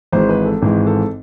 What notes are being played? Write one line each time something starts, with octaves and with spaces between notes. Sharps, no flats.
G#1 G#2 E3 G#3 C5
B4
A4
G#1 G#2 E3 G#3
A4